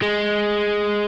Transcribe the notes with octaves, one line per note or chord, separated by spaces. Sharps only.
G#3